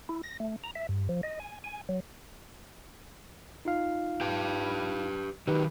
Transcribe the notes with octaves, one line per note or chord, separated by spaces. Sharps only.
E4
A#6
A3
A#5
E5
G2
F3
D#5
G#5
G#5
F#3
D#4 F4 F5
G4 B4 G5
D#3 F#3 D#4 G4 B4